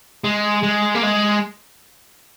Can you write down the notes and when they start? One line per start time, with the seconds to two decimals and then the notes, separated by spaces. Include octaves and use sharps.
0.24 G#3
0.63 G#3
0.95 A#3
1.03 G#3